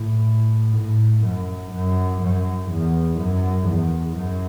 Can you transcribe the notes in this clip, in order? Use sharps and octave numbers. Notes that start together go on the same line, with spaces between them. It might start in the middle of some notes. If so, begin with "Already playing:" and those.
Already playing: A2
A2
F#2
F#2
F#2
E2
F#2
E2
F#2